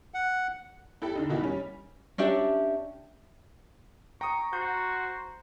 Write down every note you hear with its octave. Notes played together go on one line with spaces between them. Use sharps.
F#5
E4 G4 A4 G5
D3 D4 D#4
B2 D#3 E3 D#4 E4 F#4
G3 C#4
C#4 D4 G4 E5
G5 A#5 C#6 D#6
F#4 C5 G6